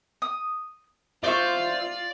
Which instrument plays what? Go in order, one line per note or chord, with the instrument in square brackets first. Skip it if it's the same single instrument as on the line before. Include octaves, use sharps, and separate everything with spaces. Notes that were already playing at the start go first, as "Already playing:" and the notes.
[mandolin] D#6
[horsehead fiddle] F4 [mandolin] C5 E5 C#6 [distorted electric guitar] D5